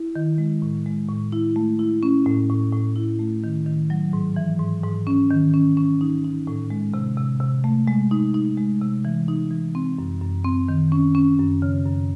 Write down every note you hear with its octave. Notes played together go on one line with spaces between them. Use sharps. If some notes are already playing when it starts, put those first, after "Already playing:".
Already playing: E4
D#3
G#3
A2
G#3
A2
E4
A3
E4
C#4
A2
A2
A2
E4
A3
D#3
D#3
F#3
G#2
E3
G#2
G#2
C#4
D#3
C#4
C#4
D#4
D#4
A2
G#3
C3
C3
C3
A3
G#3
D#4
D#4
G#3
C3
E3
D#4
E3
C4
F#2
F#2
C4
D#3
C#4
C#4
F#2
C#3
F#2